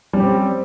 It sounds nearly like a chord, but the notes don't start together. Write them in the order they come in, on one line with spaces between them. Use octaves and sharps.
G3 C#4 G4 C4